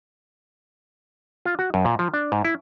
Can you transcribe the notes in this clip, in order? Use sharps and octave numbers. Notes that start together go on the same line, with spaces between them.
F4
F#4
F#2
A#2
F3
D4
G#2
E4